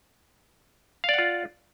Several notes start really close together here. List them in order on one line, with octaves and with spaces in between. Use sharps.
F5 D5 F#5 F4